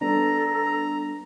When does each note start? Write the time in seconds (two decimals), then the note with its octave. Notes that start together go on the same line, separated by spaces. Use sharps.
0.01 G3 B3 D4 A4 A#5